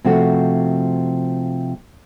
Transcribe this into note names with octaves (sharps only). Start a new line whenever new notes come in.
C3 F3 A3 F#4